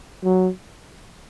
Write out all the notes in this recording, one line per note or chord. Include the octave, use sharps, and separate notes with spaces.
F#3